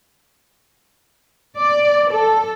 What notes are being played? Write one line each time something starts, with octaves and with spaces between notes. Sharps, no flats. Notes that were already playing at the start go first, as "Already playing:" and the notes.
D5
A4